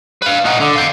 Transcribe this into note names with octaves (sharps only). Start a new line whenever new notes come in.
B4 F5
D#4 F#5
D3
F5 G5